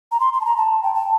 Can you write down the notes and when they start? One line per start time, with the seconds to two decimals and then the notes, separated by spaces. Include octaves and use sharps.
0.12 A#5
0.20 C6
0.33 C6
0.41 A5
0.45 A#5
0.57 A5
0.83 G5
0.94 A5